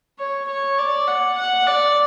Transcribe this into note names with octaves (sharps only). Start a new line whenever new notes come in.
C#5
C#5
D5
F#5
F#5
D5